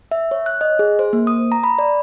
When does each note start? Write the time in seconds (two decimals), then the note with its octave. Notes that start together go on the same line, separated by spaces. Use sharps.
0.11 E5
0.31 C#5
0.46 F#6
0.61 D#5
0.79 G#4
0.99 C5
1.13 A#3
1.27 D#6
1.52 A#5
1.64 B5
1.79 D5